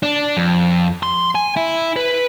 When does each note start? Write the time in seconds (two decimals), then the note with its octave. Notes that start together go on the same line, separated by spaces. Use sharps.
0.03 D4
0.37 F2
1.03 C6
1.35 G#5
1.56 E4
1.96 B4